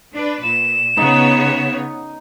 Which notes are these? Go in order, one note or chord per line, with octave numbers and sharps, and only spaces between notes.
D4 B4
A#2 E7
C#3 B3 D#4 C#5